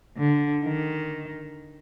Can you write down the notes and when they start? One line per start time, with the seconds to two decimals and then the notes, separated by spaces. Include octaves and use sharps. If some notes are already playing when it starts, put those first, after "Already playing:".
0.17 D3
0.64 D#3